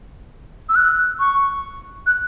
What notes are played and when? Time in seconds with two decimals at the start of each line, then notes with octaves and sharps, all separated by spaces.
0.69 E6
0.76 F#6
1.19 C#6
2.07 F#6